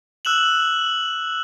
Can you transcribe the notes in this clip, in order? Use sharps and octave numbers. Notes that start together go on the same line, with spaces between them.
E6 F#6 E7 F#7